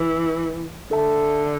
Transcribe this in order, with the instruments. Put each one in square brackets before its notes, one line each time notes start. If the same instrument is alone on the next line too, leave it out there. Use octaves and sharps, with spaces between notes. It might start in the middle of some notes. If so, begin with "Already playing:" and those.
Already playing: [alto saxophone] E3
[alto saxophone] D3 [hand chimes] D4 A4 E5 A5